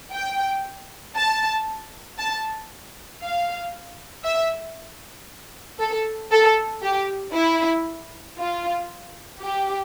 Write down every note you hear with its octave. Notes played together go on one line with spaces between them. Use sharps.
G5
A5
A5
F5
E5
A4
A4
G4
E4
F4
G4